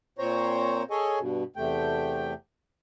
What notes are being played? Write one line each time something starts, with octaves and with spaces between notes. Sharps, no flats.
A#2 C4 C5 C#5 A#5
G#4 A4 C#5 D#5 G#5
G2 B2
E2 C3 A3 G5